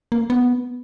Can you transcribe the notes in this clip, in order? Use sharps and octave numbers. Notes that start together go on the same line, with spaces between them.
A#3
B3